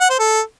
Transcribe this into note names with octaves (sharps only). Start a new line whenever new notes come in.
F#5
C5
A4